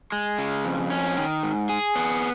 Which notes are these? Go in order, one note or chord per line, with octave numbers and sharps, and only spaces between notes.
G#3
C#3
F2
C#4
D#3
G#2
G#4
B3